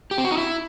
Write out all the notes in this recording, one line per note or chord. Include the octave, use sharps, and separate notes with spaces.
G4
C4
F#4
D#4
E4